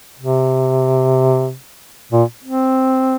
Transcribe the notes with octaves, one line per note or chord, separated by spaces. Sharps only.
C3
A#2
C4